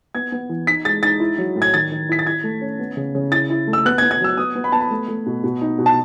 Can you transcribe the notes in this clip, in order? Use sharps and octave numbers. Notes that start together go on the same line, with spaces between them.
B3 G#6
B3
E3
D#4 B6
G#3 A6
D#4 A6
E4
F#3
A2
G#6
D#3 A6
D#3
E4 B6
A6
E4 G#6
A3
C#4
B3
C#3
C#3
E4 A6
E4
A3
E6
B3 F#6
G#6
B3
G#6
F#3 E6
B3 D#6
B3
B5
B3 A5
B5
A3
A3
B2
B2
D#4
B2
A5